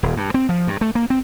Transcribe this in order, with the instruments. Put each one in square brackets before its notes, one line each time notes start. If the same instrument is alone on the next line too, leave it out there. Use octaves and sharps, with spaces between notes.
[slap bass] D#1
G2
C4
F3
G2
A3
A#3
C4